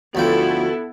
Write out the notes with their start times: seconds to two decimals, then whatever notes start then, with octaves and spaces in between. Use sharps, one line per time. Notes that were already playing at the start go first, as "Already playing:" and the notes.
0.15 D2 F3 B3 E4 F#4 A4 G5